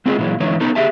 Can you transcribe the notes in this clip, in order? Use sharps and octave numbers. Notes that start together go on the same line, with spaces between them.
G#3 C4 C#4 F4 G#4 D#5
A#2 E3 F#3 G#3
D3 E3 G#3 C#4 D#4 C#5
B3 C#4 D#4 A4
A#3 G4 G#4 E5 A5